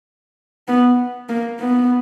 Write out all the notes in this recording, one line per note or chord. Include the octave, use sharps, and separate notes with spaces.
B3
A#3
B3